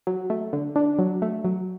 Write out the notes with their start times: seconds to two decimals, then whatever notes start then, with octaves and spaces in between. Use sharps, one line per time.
0.07 F#3
0.30 A3
0.53 D3
0.76 D4
0.99 F#3
1.22 A3
1.45 F#3